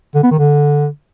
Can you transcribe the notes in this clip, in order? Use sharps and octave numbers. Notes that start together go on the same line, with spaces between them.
D3
B3
D#3
D3